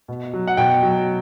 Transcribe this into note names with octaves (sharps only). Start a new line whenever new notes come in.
B2
F#3
F#5
B2 G5
F#3